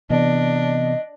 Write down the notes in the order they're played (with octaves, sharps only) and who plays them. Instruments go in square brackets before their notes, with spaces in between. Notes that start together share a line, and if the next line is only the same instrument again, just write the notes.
[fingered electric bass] C3 [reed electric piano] E3 B3 [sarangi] D4 [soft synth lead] D#5